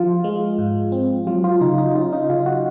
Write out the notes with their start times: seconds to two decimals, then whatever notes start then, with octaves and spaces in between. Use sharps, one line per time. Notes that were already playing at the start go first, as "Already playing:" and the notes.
Already playing: F3 F4
0.24 G#3
0.58 G#2
0.92 C4
1.27 F#3 F4
1.44 F4
1.61 C#3 D#4
1.78 D#4
1.95 C#4 F4
2.13 D#4
2.29 C#3 F4
2.46 F#4